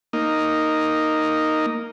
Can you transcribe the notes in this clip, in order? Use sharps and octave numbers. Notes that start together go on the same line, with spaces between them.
A#3 D#4